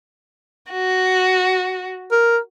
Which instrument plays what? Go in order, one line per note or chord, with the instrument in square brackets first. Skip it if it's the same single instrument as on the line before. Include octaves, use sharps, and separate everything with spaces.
[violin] F#4
[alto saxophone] A#4